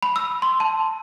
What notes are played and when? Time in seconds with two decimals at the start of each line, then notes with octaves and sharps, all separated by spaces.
0.03 B5
0.16 E6
0.42 C6
0.60 A5